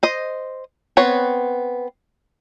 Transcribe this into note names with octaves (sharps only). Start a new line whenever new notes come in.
C5 D#5
B3 C4 B4 C#5